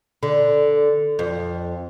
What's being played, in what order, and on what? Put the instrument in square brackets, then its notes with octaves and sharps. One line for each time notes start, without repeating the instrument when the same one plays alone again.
[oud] D3
F2